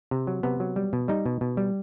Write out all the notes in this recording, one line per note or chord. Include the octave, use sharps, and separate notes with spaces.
C3
F#3
C3 B3
F#3
G3
B2
G3 D#4
B2
B2
G3